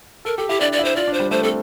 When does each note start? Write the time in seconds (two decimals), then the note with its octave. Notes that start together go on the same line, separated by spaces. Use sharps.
0.25 A4 A#4
0.38 G4 A4
0.49 E4 G4
0.60 D4 D5
0.73 D5
0.79 E4
0.85 C5
0.96 F4 D5
1.07 D4
1.14 C5
1.19 G3
1.31 A3 C5
1.43 C4 A4